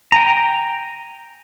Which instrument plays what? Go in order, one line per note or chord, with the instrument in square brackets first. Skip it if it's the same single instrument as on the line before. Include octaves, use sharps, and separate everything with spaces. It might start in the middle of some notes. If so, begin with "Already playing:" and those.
[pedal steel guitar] G5 G#5 A#5